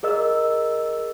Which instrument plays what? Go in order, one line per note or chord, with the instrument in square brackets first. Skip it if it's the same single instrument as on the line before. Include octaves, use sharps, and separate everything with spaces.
[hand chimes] G#4 A#4 D#5 E6